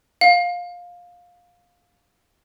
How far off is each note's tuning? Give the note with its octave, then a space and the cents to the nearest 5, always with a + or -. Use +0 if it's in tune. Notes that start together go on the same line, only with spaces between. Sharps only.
F5 +15